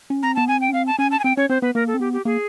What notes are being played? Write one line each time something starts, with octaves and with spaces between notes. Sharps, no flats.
C#4
C4 A#5
B3 A5
C4 G#5
G5
C#4
C4 F5
A5
C#4 G#5
A5
G#5
C4 G5
C#4 C#5
C4 C5
B3 B4
A#3 A#4
A4
C4
B3 G4
G4
A#3 G#4